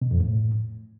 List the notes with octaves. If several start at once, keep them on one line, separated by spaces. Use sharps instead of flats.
B2
F2
A2